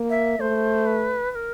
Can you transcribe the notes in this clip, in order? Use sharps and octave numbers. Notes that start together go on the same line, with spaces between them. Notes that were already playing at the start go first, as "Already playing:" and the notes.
Already playing: A#3
E5
A3 C5
B4
B4
A#4